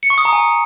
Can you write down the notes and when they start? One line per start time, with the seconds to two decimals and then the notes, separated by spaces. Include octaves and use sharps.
0.03 C#7
0.10 C#6
0.18 D#6
0.25 A#5
0.33 G#5